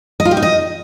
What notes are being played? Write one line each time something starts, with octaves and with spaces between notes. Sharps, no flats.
D#5
F4
G4
D#4
D#5